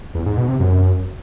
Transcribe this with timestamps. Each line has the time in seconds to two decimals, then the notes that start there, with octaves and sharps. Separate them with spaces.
0.15 E2
0.26 G#2
0.37 B2
0.49 C3
0.60 F#2